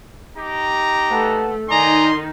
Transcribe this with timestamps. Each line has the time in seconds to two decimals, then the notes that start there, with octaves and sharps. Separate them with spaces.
0.38 D#4 G4 A#5
1.11 A3 B4 F#5 A5
1.70 D#3 D#4 D5 D#5 G#5 A#5 C6